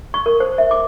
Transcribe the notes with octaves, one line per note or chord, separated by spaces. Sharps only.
C#6
A#4
C5
E5
D6